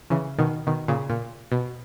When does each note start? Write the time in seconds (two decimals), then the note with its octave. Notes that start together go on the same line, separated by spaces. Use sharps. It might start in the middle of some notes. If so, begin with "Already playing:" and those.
0.10 C#3 E3
0.39 B2 D#3
0.67 B2 D#3
0.88 A#2 C#3
1.10 A#2
1.52 B2